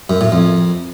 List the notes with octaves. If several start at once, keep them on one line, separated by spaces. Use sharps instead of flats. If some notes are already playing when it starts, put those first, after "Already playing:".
F#2
A2
F2